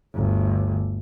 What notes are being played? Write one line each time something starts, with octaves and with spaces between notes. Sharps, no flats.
G1 D2